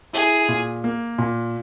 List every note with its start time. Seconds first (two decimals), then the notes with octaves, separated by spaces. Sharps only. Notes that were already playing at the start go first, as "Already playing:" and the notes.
0.13 E4 G#4
0.48 A#2
0.84 A#3
1.18 A#2